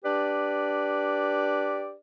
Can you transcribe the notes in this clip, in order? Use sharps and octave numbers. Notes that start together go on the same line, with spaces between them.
D4 G4 B4 D5